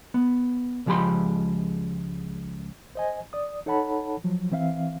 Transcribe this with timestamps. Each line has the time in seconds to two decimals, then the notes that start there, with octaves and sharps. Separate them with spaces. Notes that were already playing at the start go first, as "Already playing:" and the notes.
0.14 B3
0.86 C#2 F3 G#3 G4 B5 C6
2.95 C5 D#5 G#5
3.33 D5 D#6
3.66 D#4 A4 C#5 F#5 A5 B5
4.24 F3 F#3
4.52 E3 C4 E5 F5